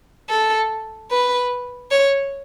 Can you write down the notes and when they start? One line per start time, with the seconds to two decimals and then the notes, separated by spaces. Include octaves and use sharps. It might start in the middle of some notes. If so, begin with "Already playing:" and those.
0.30 A4
1.11 B4
1.91 C#5